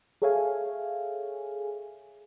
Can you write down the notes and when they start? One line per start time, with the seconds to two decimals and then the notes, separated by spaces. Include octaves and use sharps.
0.22 G#4 A4 C#5 E5 F5 G#5